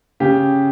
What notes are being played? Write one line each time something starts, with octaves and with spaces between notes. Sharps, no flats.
C#3 G4